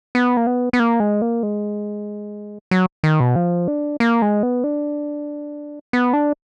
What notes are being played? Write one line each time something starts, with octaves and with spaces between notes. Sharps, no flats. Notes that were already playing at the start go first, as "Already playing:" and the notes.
B3
A#3
B3
B3
A#3
G#3
A#3
G#3
F#3
D#3
B2
F3
D4
A#3
G#3
B3
D4
B3
D4